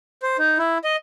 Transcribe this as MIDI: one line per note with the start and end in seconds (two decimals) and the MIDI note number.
0.22 0.37 72
0.38 0.58 63
0.58 0.78 64
0.84 0.96 75